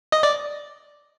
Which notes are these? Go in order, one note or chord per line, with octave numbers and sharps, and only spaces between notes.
D#5
D5